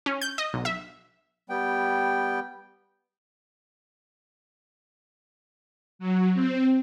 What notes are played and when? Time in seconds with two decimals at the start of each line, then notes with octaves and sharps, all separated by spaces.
0.06 C#4
0.21 G6
0.38 D#5
0.54 B1
0.65 E5
1.49 G3 B3 G5
5.99 F#3
6.34 C4